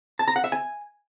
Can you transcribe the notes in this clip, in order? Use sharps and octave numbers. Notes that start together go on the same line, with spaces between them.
A5
A#5
F#5
E5
G#5